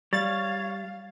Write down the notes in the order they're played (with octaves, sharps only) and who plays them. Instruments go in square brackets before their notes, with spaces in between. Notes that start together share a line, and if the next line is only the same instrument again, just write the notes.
[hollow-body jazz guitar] G3 [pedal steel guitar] C#5 [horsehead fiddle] F5 [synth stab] A6